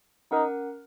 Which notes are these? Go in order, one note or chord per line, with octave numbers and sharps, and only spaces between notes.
C#4 D#4 A#4 F#5